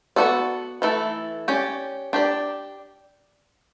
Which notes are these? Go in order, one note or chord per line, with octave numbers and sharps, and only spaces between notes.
B3 F#4 A4 D5
E3 A3 E4 A4
C#4 G4 D5
D4 G4 D5